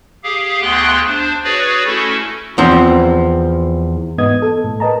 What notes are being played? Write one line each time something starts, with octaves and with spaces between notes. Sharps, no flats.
G4 G#4 F5
D2 B3 G#4 G5 C6 F#6
D4 C5
F#4 G#4 B4 C#5 D5
A3 C#4 E4 F#4 A4
E2 F3 C4
G#2 B3 D#5 D#6 G#6
A4
A2
A#4 B4 D#5 A5 A#5